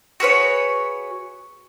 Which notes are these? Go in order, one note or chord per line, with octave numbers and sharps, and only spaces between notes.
F#4 G#4 B4 C#5